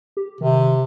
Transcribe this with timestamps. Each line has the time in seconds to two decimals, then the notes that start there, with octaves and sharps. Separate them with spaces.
0.17 G4
0.41 C3 D#3